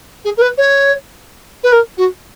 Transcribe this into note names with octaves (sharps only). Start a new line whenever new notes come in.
G#4
A#4
B4
C#5
B4
A#4
F#4